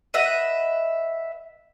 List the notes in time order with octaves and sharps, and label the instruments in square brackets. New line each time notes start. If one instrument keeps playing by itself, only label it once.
[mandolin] B4 D#5 E5 F#5